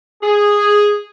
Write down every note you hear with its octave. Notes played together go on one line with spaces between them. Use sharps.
G#4